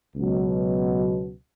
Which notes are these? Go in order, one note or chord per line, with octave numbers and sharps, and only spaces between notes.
C#2 B2 F#3